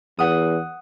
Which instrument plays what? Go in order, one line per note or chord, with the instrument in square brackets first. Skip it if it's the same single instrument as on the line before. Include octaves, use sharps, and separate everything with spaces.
[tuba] E2 [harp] F#5 D#6